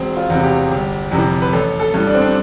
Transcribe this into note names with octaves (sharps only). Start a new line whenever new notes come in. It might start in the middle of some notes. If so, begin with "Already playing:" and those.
Already playing: E1 C4
F4
E2
C3
G4
G1
F2 C3 E3
B4
A1 A4
A4
G2 E3
D4
C4
D4